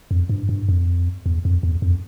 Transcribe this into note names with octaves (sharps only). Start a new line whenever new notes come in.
F2
G2
G2
F2
E2
F2
E2
F2